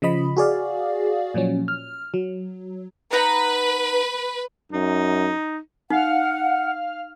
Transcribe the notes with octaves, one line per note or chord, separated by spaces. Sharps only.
C#3 F3 D#5 B5
F#4 G#4 D5 F5
A#2 F3 F#3 C#4
F6
F#3
D#4 B4 F#5 A#5
F#2 D#4
D#4 F5 F#5 F6